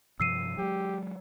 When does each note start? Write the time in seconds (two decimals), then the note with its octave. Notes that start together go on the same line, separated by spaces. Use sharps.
0.20 G2 C3 F3 E6 C7 D#7
0.58 F#3 G#3 G4